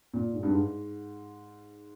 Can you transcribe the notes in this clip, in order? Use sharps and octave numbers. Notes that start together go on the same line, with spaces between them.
A#2
G#2
G2
G#2